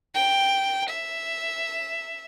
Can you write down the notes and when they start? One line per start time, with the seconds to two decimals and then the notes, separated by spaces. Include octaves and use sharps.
0.15 G5
0.89 E5